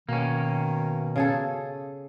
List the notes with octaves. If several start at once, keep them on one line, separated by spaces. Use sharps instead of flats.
B2 D#3 A#3 C#4
C#3 G#4 A4